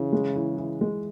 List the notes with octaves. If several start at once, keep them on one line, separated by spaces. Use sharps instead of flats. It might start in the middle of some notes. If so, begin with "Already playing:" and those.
Already playing: C#3 E3
G#3
E3
E3
G#3